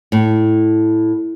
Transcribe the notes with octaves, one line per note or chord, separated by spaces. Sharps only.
A2